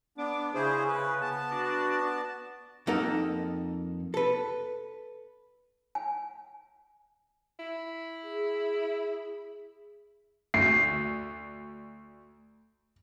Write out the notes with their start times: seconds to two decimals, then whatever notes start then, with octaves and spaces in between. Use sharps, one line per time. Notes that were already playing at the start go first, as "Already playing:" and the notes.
0.18 B3 D4 D6
0.54 C#3 E4 G#4 C5
0.88 B4
1.21 B3 A5
1.51 D4 F#4 D5
2.87 F2 A#3 D#4 A4 A#4 F#5
4.14 A4 B4
5.95 G#5
7.59 E4
8.23 G#4
10.54 D2 C7